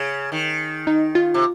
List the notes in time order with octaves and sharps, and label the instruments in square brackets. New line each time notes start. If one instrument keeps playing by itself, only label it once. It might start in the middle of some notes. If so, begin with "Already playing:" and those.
Already playing: [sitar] C#3
D#3
[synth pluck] D#4
F4
[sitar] C3